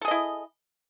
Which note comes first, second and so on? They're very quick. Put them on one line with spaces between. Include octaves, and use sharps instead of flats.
A4 G#4 D#5 E4